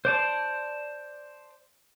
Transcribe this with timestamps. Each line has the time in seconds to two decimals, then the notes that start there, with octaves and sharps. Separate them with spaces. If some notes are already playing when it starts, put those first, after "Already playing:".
0.05 C5 D5 A5